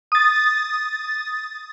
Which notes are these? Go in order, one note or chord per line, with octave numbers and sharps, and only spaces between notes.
D#6 A6